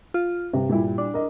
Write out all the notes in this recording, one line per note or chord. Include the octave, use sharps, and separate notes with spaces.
F4
G2 C3
A#2 G3 E4
D4
A#4 D#5